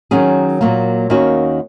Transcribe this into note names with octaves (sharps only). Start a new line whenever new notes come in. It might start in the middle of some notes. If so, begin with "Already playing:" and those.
D#3 F#3 C#4 G#4
A#2 F#3 A#3
D#2 D#3 A#3 C#4 F#4